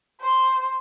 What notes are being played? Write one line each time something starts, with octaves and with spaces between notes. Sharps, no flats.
C5